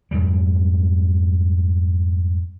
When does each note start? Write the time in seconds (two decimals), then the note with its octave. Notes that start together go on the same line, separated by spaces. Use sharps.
0.11 F2 G#2 F#3 G3